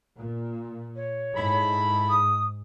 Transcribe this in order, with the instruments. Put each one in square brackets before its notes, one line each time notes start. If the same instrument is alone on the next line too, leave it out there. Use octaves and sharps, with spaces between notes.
[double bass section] A#2
[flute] C#5
[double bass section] G#2 [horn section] E4 A4 B5
[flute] D#6